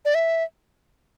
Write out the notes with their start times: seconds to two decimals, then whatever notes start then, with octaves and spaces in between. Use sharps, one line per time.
0.05 D5
0.15 E5